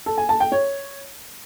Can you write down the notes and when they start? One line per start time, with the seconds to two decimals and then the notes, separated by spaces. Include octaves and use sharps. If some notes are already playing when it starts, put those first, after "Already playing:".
0.06 A4
0.18 G#5
0.29 A5
0.40 G5
0.52 C#5